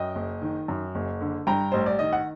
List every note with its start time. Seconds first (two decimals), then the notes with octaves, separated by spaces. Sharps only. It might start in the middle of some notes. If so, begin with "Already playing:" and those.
Already playing: F#2 D#5 G5
0.15 F#1
0.42 D#3
0.68 F#2
0.95 F#1
1.21 D3
1.47 G2 G5 A#5
1.72 A1 C5
1.86 D5
1.99 D#3 D#5
2.13 F#5